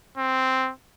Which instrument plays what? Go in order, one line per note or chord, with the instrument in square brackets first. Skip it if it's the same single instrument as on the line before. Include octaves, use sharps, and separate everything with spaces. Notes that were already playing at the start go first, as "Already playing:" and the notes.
[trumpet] C4